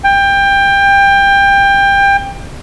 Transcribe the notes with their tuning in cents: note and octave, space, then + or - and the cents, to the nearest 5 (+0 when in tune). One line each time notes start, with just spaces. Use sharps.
G5 +20